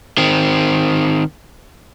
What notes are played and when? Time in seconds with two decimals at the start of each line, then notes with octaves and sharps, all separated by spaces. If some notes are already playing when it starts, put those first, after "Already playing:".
0.18 D#3 C4